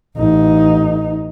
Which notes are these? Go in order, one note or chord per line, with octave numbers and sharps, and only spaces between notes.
A1 D#4